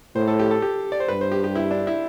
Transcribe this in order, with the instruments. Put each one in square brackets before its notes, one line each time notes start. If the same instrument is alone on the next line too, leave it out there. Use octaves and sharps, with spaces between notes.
[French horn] A2 [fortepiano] C5
[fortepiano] A4
G4
A4
G4
D5
C5
[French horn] G2 [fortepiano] B4
[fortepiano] C5
G4
G4
E4
D4
E4